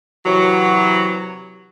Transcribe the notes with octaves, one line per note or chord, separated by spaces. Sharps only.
C3 E3 F#3